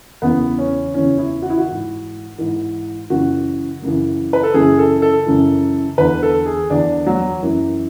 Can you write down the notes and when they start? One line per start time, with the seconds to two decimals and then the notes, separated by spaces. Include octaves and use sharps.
0.22 E2 C#3 E3 B3
0.58 C#4
0.94 E2 C#3 E3 C#4
1.18 E4
1.42 F#4
1.50 E4
1.58 F#4
1.66 G#2 E3
2.38 G#2 E3
3.10 F#2 C#3 E3 F#4
3.82 F#2 C#3 E3
4.33 B4
4.43 A4
4.54 F#2 C#3 E3 G#4
4.79 A4
5.02 A4
5.26 F#2 C#3 E3
5.98 E2 D3 B4
6.23 A4
6.46 G#4
6.70 E2 D3 D4
7.06 F#3
7.42 F#2 E3